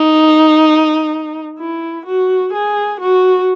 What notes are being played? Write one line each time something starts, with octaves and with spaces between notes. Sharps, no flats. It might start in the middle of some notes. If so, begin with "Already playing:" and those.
Already playing: D#4
E4
F#4
G#4
F#4